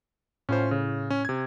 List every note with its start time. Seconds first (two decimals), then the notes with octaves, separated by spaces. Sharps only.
0.49 A2 C#4 F4 C5
0.71 C#3
1.10 C#4
1.25 C3 G#6